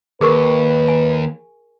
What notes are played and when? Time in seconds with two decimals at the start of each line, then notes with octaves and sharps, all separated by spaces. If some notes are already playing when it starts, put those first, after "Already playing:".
0.21 D#2 G#4 A#4 B4 C#6
0.88 G#5